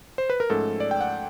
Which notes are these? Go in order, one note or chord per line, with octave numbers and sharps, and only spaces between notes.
C5
B4
A#4
G#2 F3 A3 C#4 A4
D5
G5
F#5